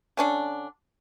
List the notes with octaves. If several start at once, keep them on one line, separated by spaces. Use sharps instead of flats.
D3 C#4 D4